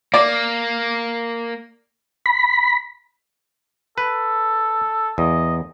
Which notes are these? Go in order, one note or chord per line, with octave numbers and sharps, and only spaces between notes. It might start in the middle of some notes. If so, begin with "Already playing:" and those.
A#3 D5
B5
A4 B4
E2 D#5